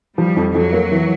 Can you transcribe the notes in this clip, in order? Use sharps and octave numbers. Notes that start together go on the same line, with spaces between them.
F3 G3
F2
F2 F#3
A#3
E3